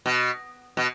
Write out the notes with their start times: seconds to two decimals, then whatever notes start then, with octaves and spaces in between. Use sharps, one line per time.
0.06 B2
0.77 B2